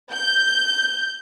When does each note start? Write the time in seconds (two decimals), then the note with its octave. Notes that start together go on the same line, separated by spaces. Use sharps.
0.12 G6